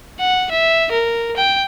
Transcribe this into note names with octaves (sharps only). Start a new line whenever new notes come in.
F#5
E5
A#4
G5